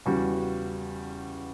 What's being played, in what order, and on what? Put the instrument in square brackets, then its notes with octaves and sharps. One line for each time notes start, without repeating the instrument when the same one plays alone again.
[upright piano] E2 C#3 G3 C#4 F#4